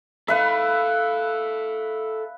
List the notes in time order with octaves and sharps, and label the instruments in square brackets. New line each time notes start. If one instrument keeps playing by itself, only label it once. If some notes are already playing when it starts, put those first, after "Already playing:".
[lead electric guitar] A4 C#5 [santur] B4 E5 [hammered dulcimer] F5 B5